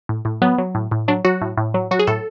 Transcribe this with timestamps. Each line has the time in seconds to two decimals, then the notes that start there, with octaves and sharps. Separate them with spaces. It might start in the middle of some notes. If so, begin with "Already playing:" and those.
0.09 A2
0.25 A2
0.42 F#3 B3
0.58 F#3
0.75 A2
0.92 A2
1.08 F#3 D4
1.25 F#3 F#4
1.41 A2
1.57 A2
1.74 F#3
1.91 F#3 F#4
1.99 G#4
2.07 A2 A4